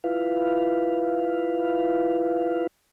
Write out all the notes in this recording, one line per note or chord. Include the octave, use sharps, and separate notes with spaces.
E4 F4 B4 F5